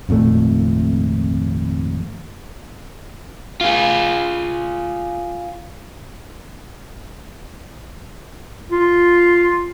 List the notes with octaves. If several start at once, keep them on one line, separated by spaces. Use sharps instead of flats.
G#1 F2 A#2 A3
F4 G#4
F4